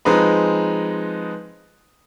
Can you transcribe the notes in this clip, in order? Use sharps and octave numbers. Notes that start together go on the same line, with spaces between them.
F3 G#3 C4 D#4 B4